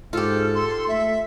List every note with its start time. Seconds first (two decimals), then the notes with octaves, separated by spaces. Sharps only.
0.13 G#2 F4 G4 A4 F6
0.54 C6
0.88 A3 E5